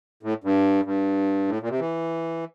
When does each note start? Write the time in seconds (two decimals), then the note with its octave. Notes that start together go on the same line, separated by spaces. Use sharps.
0.23 A2
0.44 G2
0.85 G2
1.48 A2
1.61 A#2
1.69 C3
1.79 E3